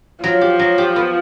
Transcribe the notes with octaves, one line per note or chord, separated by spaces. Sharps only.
F3 F#3
G4
F#3
G4
B3